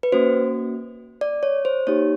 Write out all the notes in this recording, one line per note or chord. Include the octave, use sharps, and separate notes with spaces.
B4
A#3 C#4 F#4 C5
D5
C#5
C5
A#3 D#4 G4 C#5